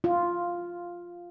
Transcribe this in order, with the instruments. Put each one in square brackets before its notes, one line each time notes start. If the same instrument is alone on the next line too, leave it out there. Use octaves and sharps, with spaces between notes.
[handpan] F4